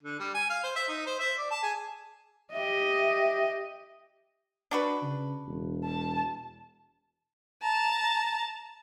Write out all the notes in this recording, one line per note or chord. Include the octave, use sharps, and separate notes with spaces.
D3
G3
G#5
F5
C5
E5
D#4
C5
E5
D5
A5
G#4
G4 D#5 E5
D4 F#4 B4
C#3
E1
A5
A5 A#5